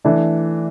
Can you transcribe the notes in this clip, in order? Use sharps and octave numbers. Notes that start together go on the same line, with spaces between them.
E3 A3 D4 A4